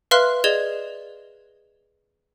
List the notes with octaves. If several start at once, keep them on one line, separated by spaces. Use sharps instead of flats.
B4 E5 F5 C6 F6 F#6
G#4 D5 D#5 G#6 E7 G7